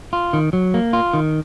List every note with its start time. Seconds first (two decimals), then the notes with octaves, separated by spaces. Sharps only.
0.13 F4
0.33 D#3
0.53 F#3
0.74 A#3
0.93 F4
1.14 D#3